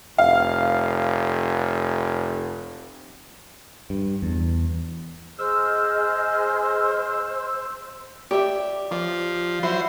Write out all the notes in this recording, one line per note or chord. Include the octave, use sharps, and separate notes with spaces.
F1 F5
G2
E2
G#4 C5 D#5 E6 F6
G4 D5 E5 D6 D#6
F3 D6
F#3 E4 C5